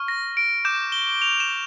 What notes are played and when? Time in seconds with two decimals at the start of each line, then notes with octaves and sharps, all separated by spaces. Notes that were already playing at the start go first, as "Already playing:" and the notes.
Already playing: C#6 F6
0.08 A#6
0.37 D7
0.65 D6 G6 E7
0.92 G7
1.22 F7
1.40 E7